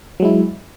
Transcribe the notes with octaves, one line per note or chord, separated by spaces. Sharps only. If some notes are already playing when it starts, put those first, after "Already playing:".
F#3 G#3 E4